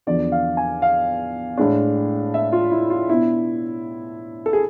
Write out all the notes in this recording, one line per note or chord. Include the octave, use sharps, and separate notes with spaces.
E2 D3 F3 D5
F5
G#5
F5
A2 G#3 D4
E5
F4
E4
F4
B2 B3 D4 E4
A4
G#4